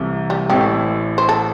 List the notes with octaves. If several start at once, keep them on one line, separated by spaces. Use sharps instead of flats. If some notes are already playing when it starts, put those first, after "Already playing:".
Already playing: C2 C3 E3 A3
G3
A1 A2 A3 C4 G4
C5
A4